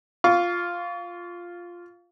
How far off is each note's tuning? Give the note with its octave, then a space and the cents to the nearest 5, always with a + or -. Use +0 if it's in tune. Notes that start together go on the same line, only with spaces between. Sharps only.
F4 +0 F5 +0 C#6 +35